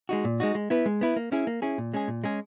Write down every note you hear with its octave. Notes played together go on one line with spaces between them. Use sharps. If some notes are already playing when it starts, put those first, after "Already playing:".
G#3 D#4 F#4
A#2
G#3 D#4 F#4
G#3
B3 E4 B4
G#3
B3 E4 B4
A#3
C#4 E4 G#4
A#3
C#4 E4 G#4
A#2
G#3 C#4 G#4
A#2
G#3 C#4 G#4